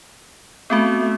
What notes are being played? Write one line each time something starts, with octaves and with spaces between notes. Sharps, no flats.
A3 B3 C4 F#4